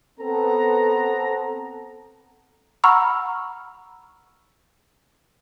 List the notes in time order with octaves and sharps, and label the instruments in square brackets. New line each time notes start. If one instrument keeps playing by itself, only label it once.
[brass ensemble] B3 C4 A4 A#5
[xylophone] F#5 A#5 B5 C#6 E6 F6